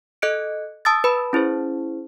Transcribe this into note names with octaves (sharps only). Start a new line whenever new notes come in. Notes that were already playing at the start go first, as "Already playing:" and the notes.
A4 D#5 F#6 C#7 D7
A5 D#6 E6 A6
B4 A5 B5
C#4 E4 G#4 C5